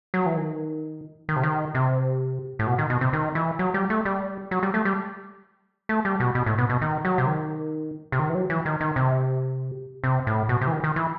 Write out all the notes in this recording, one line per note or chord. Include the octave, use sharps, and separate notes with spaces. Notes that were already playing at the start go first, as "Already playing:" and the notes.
F#3
E3
D#3
D#3
C3
D#3
C3
A2
B2
D#3
B2
C3
D#3
E3
F#3
G3
A3
G3
F#3
G3
A3
G3
A3
G3
B2
B2
A2
B2
B2
D#3
F#3
C3
D#3
C3
D#3
E3
F#3
E3
D#3
D#3
C3
C3
A2
B2
C3
E3
D#3
D#3
E3